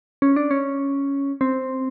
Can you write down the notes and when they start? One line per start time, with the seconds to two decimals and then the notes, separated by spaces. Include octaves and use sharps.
0.22 C#4
0.36 D4
0.51 C#4
1.41 C4